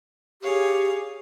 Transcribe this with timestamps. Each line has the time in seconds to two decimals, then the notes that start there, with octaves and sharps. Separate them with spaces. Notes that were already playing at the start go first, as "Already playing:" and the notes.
0.42 G4 G#4 C#5 F5